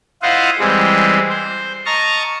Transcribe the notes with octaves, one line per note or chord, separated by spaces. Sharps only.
E4 F4 C5 D#5 F5 F#5
E3 G3 G#3 C4
C5
D#5 A5 A#5 C#6 F6